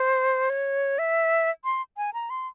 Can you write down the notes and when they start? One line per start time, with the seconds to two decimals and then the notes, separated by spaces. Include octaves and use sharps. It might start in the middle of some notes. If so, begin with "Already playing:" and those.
Already playing: C5
0.50 C#5
0.99 E5
1.65 C6
1.97 G#5
2.14 A#5
2.30 C6